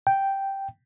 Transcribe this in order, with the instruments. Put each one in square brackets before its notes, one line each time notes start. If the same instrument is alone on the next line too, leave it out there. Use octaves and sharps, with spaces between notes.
[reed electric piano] G5